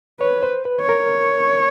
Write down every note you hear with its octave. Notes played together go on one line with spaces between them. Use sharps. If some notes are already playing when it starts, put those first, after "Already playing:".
B4 C#5
C5
B4
C#5
A#4